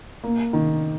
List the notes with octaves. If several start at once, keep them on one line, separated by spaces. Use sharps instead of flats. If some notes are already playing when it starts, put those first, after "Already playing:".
A#3
D#3